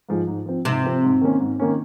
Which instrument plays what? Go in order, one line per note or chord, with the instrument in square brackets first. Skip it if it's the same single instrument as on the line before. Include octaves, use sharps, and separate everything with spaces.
[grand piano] G#2 F3 G#3
G#2
F3 C4
[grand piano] G#2 [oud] C3
[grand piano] F3 C4
G#2
D#3 A#3 C#4
G#2
D#3 A#3 C#4